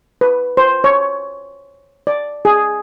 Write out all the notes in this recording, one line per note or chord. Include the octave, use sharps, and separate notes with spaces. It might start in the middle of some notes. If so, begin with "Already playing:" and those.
B4
C5
C#5
D5
G#4